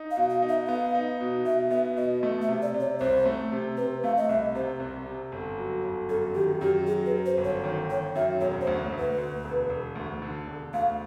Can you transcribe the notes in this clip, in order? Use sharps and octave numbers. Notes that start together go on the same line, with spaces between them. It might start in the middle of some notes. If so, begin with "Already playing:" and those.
Already playing: D#4
F5
B2
F5
D#4
E5
B3 F5
D#4
B2
B2 E5
B3 E5
B2 D#5
A3
E5
C3
D5
C3
C#5
C2 C5
A3
C3
C3 B4
A3 F5
D#5
C2 E5
C3 C5
C2
C3
G1
F#3
G1
F#2 A4
D#3 G4
F#2 G4
F#3 G#4
B4
F#2
C5
G1
C#5
D#3
D#3 C#5
F#2 E5
E1 C#5
C5
D2
D2
B4
D2
E1
E1
D2
D3
E1
D2 F5